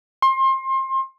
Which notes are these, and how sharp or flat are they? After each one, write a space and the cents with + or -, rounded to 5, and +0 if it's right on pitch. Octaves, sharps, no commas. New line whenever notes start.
C6 +30